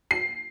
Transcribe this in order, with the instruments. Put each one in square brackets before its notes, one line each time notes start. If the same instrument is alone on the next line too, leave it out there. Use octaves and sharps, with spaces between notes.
[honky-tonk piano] C7